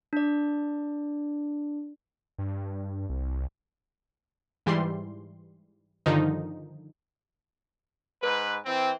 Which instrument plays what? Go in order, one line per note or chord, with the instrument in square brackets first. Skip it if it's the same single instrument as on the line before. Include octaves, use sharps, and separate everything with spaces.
[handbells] D4 D5
[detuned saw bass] G2
C2
[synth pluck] G#2 E3 G3 C6
G2 D3 D#3 F3 D#4
[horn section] G#2 B4
E3 C4